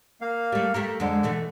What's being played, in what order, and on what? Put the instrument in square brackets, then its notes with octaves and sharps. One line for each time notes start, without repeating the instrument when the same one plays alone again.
[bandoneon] A#3 F5
[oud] G3 A3
A3 G4 A#4
[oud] F2 G#3 [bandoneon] D3
[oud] B2 E3 A3